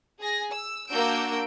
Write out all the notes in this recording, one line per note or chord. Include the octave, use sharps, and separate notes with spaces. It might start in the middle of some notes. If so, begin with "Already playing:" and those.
G#4 G#5 A#6
E6
A#3 D4 F#4 E6 G6 D7